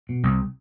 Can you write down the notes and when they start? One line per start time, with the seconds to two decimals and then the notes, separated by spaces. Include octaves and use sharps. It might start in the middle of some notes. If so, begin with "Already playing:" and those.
0.09 B2
0.23 C2